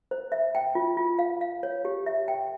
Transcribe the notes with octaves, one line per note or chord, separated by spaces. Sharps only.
C5
E5
G5
F4
F4
F5
F5
C#5
G4
E5
G5